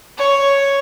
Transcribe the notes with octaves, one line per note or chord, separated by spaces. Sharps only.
C#5